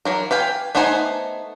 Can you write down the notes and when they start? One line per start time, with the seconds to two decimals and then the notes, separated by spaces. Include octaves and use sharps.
0.05 E3 F#3 A#4
0.31 B4 F5 G5 G#5
0.75 A3 B3 D#4 C5 G#5